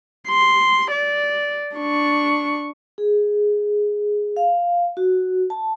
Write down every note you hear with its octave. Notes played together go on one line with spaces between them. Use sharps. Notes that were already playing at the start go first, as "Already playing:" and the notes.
C6
D5
D4 C#6
G#4
F5
F#4
A5